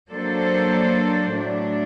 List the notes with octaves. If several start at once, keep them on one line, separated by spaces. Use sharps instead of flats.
F#3 A#3 D4 A4 C5
A2 F#3 A3 D4